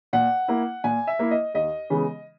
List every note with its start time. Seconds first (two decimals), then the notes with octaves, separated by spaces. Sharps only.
0.13 A#2 F#5
0.48 A#3 E4
0.84 A#2 G#5
1.07 E5
1.19 A#3 E4
1.31 D#5
1.54 D#2 D#5
1.90 C#3 E3 G#3 B3